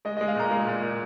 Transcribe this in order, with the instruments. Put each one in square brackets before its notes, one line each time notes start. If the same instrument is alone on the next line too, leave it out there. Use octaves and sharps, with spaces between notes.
[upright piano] G#3 D#5
D#5
G#3
F5
A#2 A#5
G#3
A#2
A#2